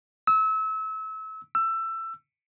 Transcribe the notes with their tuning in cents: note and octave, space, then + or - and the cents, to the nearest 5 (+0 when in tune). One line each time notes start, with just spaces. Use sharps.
E6 -30
E6 +20